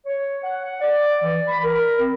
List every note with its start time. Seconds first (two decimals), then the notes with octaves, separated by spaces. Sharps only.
0.06 C#5
0.43 F#5
0.63 F#5
0.81 D5
1.22 E3
1.48 B5
1.64 A#4
1.99 C4